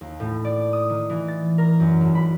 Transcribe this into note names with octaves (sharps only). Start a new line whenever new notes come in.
D#2
A2
D5
D#6
D#3
E3
A6
A#4
F#2
G#1
B5